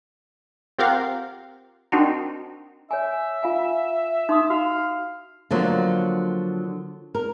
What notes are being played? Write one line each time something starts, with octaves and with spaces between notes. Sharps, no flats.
C4 F4 G4 A#4 F5 F#5
C4 D4 D#4 F#4 A#4
C#5 E5 G#5
F4 F5 G#5
D#4 C6 D#6
F#4 F5
D3 F3 F#3 A#3
A#4